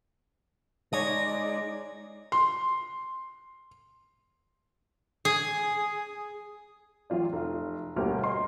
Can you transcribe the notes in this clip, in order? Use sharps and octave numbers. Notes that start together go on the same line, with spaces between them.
G#3 D#4 C#5 D5 D#6 A#6
C6
G#4
A1 F#3 F4 D5
F1
G1 D2 B2 A#3 G4 F6
D#5 C6